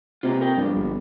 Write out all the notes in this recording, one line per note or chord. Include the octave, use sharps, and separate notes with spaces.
C3 A#3 B3 F4
A#4 G5
G2 F3 B3 D4
G1